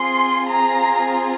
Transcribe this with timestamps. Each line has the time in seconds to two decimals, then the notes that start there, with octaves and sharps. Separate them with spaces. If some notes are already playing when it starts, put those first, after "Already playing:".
Already playing: C4 F4 G#4 C6
0.49 A#5